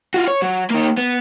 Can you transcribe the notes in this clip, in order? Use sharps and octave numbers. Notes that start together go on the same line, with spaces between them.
F4 F#4
C#5
F#3
A#3 D#4
B3